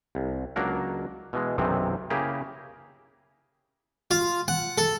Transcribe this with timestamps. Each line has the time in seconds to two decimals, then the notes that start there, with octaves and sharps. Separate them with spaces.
0.15 C2
0.56 C#2 F#3 A#3 D4 A#4 F#5
1.33 B2 E3 G#3
1.58 B1 F#2 C3 D#3 E3 C4
2.10 C#3 A#3 E4 G4 G#4 A#4
4.11 F4
4.48 F#5
4.78 A4